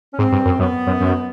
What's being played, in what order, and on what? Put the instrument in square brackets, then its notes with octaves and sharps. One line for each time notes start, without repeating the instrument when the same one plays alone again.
[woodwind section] C#4
[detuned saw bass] G#2 [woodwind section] C4
[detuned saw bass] G2
F#2
[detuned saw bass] F#2 [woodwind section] B3
[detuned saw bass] F#2
F#2